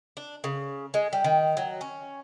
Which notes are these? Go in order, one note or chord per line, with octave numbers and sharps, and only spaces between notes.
D4
C#3
G#3
G3
D#3
F#3
C#4